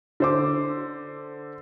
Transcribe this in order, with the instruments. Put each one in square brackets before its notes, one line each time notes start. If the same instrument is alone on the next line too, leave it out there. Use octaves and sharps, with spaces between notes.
[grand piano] D3 C5 D6